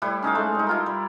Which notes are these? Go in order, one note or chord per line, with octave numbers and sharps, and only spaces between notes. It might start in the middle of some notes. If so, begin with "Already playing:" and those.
A2 G3 E4 B4
C#4 D#4 A4 F5
G#3 A3 C5
G3 D#4
E4 F4 A#4
G3